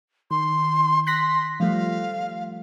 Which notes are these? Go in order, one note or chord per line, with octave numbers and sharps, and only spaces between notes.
D#3 C6
C6 F#6 A#6 B6
F3 G3 A3 F5